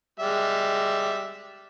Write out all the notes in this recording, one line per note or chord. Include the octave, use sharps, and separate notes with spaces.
G3 G#3 E5